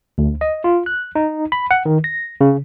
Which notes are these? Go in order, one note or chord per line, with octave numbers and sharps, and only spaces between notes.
D2
D#5
F4
F#6
D#4
B5
F#5
D#3
A#6
C#3